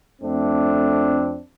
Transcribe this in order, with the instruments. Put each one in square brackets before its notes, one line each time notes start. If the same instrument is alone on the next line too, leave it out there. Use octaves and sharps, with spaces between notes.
[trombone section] F2 A3 C4 D4